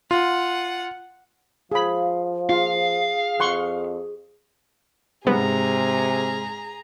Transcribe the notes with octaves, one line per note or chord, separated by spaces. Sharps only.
F4 F#5
F3 G#4 F5 B5
F4 G#4 F5
F2 F#5 C6 C#6
G#2 C3 G#3 B3 G#4 A#5